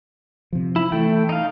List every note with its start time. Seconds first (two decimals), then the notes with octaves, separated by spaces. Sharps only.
0.53 C3 F3
0.76 E4
0.92 E3 A3 G5
1.29 D#4 F5